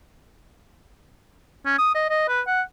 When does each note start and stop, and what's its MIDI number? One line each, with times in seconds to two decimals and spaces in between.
1.66 1.77 61
1.79 1.93 87
1.95 2.09 75
2.10 2.26 75
2.28 2.41 71
2.48 2.62 78